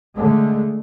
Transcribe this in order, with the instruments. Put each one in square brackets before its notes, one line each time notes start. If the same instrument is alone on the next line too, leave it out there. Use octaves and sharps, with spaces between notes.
[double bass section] D3 G#3 A3